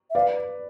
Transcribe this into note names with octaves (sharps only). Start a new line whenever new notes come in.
E5
B4 D5 F5